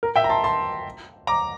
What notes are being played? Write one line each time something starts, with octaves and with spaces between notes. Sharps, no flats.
A#4
E5 G5
A#5
A5 C6
A5 C6
A#5 D6